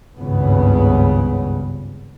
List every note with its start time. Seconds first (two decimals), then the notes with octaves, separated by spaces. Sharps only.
0.17 G#1 C#2 G2 C#3 B3